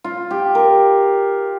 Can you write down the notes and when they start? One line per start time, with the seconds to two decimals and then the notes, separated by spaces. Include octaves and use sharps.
0.04 F4
0.31 G4
0.55 A#4